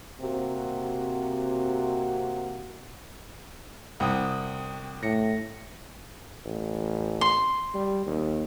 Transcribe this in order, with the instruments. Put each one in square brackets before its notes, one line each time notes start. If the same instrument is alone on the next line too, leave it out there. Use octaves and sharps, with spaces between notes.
[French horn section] C3 A#3 C4 F#4
[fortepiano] C2 [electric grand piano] F#5 G5 D#6
[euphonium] A2 [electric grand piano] A#6 C#7
[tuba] A1
[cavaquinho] C6
[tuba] G3
D#2